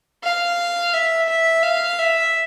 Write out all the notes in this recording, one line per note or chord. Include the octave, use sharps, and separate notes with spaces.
F5
E5
E5
F5
E5